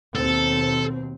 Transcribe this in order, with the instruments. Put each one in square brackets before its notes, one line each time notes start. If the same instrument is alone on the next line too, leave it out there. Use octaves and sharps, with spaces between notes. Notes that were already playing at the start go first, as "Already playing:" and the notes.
[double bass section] D#2 B2 C4 [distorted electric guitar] A4